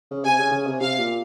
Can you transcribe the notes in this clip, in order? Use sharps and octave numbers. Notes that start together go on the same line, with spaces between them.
C#3
C3 G#5
C#3
C#3
C3
C3 F5
A#2